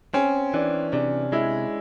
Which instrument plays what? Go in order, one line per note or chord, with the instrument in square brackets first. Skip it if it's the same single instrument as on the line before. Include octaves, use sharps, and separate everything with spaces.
[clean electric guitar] C4 [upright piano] C#4
[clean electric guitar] E3 [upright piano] D4
[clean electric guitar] C3 [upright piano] D4
[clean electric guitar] G#3 [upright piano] E4